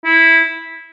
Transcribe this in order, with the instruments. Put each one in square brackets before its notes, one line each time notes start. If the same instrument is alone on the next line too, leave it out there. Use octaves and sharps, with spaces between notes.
[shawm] E4